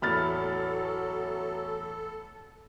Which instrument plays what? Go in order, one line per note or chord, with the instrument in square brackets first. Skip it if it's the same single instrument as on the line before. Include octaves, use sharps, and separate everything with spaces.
[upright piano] E2 A2 E4 [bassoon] F#3 [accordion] A4 [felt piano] B5 F6 A6